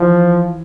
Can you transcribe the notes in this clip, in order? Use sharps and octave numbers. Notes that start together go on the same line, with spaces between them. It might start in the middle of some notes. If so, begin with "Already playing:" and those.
Already playing: E3 F3